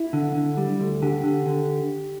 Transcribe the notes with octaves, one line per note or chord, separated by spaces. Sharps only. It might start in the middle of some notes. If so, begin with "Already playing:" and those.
Already playing: E4
D3
D3
G3
D2
D3 G4
D3
D3